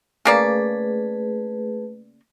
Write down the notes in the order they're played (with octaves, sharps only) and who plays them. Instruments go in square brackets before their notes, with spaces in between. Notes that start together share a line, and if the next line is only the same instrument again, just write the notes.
[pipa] C#3 A#3 D5 [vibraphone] A3 G#4 B4